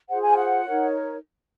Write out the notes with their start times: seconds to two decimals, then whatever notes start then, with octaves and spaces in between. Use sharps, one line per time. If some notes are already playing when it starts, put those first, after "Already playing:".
0.08 F4 G#4 C5 F#5
0.22 G#5
0.37 F#5
0.65 D#4 A#4 C#5